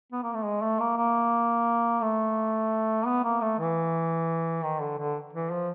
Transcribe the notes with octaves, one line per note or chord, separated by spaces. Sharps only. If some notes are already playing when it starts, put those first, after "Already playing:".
B3
A#3
A3
G#3
A3
A#3
A#3
A3
B3
A#3
A3
E3
D#3
D3
D3
E3
F3